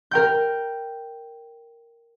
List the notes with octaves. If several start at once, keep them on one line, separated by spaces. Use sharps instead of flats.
A#4 G5 G6